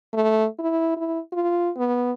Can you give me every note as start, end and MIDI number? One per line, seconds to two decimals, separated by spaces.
0.14 0.46 57
0.59 0.96 64
0.97 1.19 64
1.33 1.70 65
1.77 2.12 59